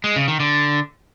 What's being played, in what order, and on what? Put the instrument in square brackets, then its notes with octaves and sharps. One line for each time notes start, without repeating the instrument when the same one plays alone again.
[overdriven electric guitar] G#3
C#3
D#3
D3